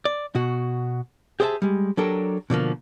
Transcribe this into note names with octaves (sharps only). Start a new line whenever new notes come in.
D5
B2 F#4
G4 G#4 C5 C#5 E5 A5
G3 G#3
F#3 D4 G4 A4 A#4
B2 D3 F3 A#3